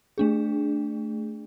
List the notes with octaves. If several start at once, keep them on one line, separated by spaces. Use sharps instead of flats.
A3 D4 G#4